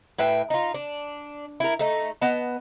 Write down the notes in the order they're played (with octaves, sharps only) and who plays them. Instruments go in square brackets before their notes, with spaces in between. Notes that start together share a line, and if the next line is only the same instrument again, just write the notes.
[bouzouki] A2 B4 E5 G5
D#4 F4
D4
E4 A#4
A3 D#4
B3 D#5 A5